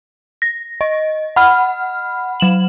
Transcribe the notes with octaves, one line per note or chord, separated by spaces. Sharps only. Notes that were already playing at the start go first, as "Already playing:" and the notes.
A#6
D#5
F#5 B5 F6
F#3 E7 F#7